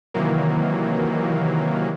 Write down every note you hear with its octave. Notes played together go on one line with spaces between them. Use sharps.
C3 D#3 E3 F#3 A#3